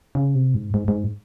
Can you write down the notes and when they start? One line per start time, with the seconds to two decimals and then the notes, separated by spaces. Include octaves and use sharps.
0.15 C#3
0.35 C3
0.54 G#2
0.74 G#2
0.88 G#2